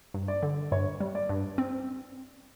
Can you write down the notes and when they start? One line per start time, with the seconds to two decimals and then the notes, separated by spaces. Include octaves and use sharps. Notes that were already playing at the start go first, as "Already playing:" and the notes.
0.14 G2
0.28 D5
0.43 D3
0.72 G2 C#5
1.00 G3
1.15 D5
1.29 G2
1.58 C4